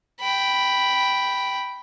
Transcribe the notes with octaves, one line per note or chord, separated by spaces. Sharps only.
G5 B5